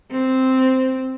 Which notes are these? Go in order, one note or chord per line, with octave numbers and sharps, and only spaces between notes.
C4